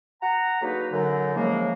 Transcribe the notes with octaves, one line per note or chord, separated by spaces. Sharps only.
F#5 A#5
D3 F#3 A#3 D#4 G#4 B4
F#2 D3 F#3 D#4
A2 C#3 F3 F#3 G#3 A#3